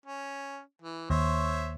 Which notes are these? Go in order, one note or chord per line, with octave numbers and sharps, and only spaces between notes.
C#4
E3
D#2 C5 C#5 E5